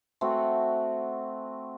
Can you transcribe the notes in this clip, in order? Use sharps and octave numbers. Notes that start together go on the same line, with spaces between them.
A3 C4 F#4